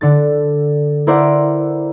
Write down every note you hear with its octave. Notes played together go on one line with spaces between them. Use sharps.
D3 D4 A4 A6
E4 A#4 C5 D5 E5 F#5